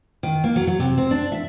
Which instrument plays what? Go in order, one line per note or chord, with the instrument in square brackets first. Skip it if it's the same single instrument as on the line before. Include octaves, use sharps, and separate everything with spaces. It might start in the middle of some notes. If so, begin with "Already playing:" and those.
[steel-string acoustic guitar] D#3
A#3
F#3
F#3
C3
C4
D4
E5